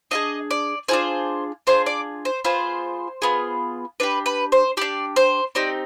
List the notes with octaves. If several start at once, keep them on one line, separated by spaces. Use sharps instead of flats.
D4 F4 G#4 D#5
D5
D4 F4 G#4 C5
D4 F4 G#4 C5
D5
C5
B3 F4 G#4 C5
B3 F4 G#4
D4 G4 B4
B4
C5
D4 G4 D5
C5
C4 D#4 G4 D5